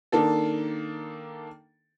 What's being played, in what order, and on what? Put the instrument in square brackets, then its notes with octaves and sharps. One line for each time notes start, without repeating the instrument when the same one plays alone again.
[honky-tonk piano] D#3 A#3 D4 A4